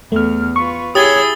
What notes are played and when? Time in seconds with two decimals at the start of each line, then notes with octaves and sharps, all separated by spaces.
0.12 E2 A3 F6
0.56 F4 B4 C#6
0.95 E4 G4 G#4 C#5 D#6 G#6 A6 G7